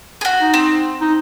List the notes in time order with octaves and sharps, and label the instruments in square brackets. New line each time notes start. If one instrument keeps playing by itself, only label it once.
[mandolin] F#4 G#4
[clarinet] D#4
[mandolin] C4
[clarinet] D#4